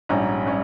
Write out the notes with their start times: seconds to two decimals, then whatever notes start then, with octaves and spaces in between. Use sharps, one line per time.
0.09 A#1 G#2 G3 C#4 A#5
0.46 G3 C#4